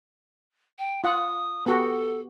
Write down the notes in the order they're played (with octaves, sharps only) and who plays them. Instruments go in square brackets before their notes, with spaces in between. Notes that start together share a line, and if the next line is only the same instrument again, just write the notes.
[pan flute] G5
[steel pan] F4 F#5 [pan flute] D#6
[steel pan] B3 F#4 G4 [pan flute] A4